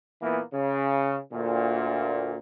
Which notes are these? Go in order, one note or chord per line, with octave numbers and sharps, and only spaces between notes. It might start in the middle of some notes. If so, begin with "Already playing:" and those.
A#2 E3 A#3 B3
C#3
D2 A#2